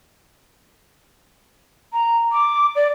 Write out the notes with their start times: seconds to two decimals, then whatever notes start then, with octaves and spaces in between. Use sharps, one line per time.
1.93 A#5
2.32 D6
2.76 D5